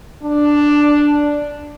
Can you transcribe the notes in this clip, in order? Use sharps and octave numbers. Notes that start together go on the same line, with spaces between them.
D4